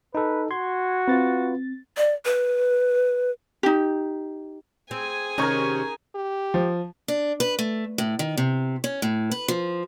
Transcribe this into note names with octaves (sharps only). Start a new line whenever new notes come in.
D#4 A4 B4
F#4 C6 G#6
C4 F4 B4 A6
D5
B4
D#4 G4
C4 G#4 G#5
C3 D#3 C#4 D#4 A#4 C#6 G#6
G4
F3
D4
B4
A3
A2
D#3
C3
C#4
A2
B4
F3